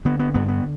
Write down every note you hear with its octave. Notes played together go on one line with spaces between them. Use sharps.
D3 B3
B3
G2 B3
B3